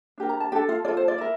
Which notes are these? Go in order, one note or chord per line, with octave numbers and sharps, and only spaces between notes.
D4 G4 A#4
A#5
A5
D4 G4 A4 G5
F4 F5
F4 A4 D5
C5
D5
E4 A#4